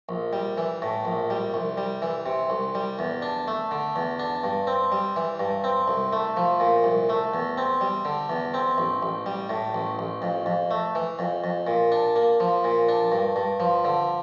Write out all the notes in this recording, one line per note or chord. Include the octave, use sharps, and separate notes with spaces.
A#1
G3
E3
A2
A#1
G3
C2
G3
E3
C3
C2
G3
E2
D4
A3
D3
E2
D4
G2
C4
G3
E3
G2
C4
C2
A3
F3
A#2
C2
A3
E2
C4
G3
D3
E2
C4
A1
A1
G3
A2
A1
A1
F2
F2
A3
E3
F2
F2
A#2
D4
A#3
F3
A#2
D4
G2
G2
F3
D3